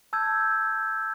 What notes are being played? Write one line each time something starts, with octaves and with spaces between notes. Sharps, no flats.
A5 E6 G6 G#6